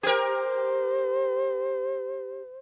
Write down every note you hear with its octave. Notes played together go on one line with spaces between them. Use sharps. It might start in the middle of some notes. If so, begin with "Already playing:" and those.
G4 A#4 C5